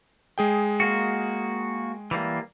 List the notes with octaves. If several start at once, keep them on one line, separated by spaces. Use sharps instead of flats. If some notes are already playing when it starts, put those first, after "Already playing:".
G#3 G#4 G5
A#3 F#4
E3 G3 A#3